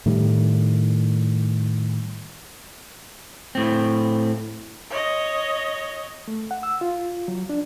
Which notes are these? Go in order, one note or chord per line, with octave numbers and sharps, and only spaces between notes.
A2 D#3 G3
A2 C4
C#5 D#5
A3
F#5
E6
F4
F#3
D4